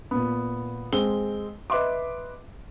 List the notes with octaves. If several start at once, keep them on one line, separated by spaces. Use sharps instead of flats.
A#2 B3
G#3 C4 E6 G7
B4 D#5 E5 C6 D6